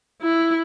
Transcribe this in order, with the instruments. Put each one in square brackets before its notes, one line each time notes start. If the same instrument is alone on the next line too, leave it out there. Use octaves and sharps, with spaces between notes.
[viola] E4